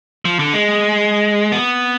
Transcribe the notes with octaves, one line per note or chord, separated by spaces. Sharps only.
F3
D3
G#3
B3